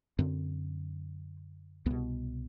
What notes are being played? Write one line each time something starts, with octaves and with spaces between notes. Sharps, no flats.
F#2 D3 C4
C2 B2 B3